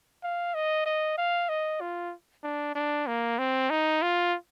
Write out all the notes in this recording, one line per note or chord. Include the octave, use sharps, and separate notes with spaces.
F5
D#5
D#5
F5
D#5
F4
D4
D4
A#3
C4
D#4
F4